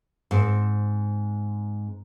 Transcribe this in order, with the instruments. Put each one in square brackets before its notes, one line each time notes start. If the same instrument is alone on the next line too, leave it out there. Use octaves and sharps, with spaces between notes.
[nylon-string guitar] G#2 C4